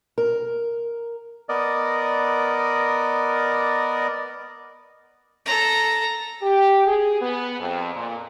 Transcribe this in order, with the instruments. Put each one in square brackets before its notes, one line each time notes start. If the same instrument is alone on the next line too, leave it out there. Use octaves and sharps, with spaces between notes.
[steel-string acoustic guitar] A#4
[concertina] B3 A#4 D5 D#5
[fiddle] A4 A#5
[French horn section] G4
G#4
B3
F2
A#2